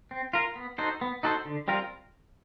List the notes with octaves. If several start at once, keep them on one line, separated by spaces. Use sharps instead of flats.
C4
F4 A#4
B3
D#4 F#4 A4 C5
B3
D#4 F#4 A4 C5
D3
G3 C4 F4 A#4